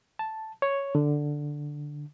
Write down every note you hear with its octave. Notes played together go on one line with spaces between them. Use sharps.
A5
C#5
D3